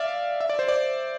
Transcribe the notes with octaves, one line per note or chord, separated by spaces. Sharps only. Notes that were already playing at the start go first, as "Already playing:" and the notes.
Already playing: D5 E5 F5
E5
D5
C5
D5